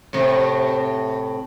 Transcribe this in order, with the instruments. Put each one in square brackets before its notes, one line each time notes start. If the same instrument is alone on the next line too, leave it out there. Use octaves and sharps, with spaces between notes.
[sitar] A2 C3